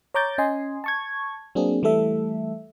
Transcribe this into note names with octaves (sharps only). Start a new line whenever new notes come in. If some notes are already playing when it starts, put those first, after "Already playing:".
C#5 A#5 D6 G6 A6
C#4 D#5 G#5 C6
A5 C#6 G#6
F#3 A#3 C4 D4 G#4
E3 G3 A3 A4 E5